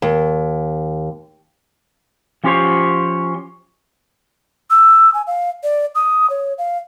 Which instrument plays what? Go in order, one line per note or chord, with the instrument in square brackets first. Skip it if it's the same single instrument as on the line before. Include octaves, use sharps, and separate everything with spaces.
[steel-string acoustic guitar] D#2
[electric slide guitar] F3 C#4 F4 G4 C5 C#5
[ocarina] E6
G#5
F5
D5
D#6
C#5
F5